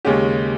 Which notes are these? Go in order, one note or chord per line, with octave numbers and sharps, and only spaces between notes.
D#2 C#3 G#3 C#4 G4